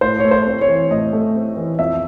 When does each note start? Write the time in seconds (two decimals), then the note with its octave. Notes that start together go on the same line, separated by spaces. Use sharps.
0.01 A2 C5
0.20 A3 C#5
0.31 C5
0.47 C4
0.61 C#5
0.68 E3
0.91 A2 D#5
1.13 A3
1.35 C4
1.57 E3
1.79 F2 E5